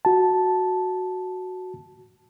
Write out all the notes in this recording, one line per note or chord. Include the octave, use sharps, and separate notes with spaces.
F#4 A5